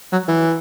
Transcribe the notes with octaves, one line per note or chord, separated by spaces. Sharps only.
F#3
E3